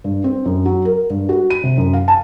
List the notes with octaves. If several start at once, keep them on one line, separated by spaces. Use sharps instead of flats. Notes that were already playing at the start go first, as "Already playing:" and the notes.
G2
C4
F#2
F#3
A#4
G2
F#4
D#7
C3
F#2
F5
A5